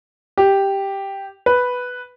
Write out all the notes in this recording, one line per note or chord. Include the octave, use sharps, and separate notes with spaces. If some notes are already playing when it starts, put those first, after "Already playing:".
G4
B4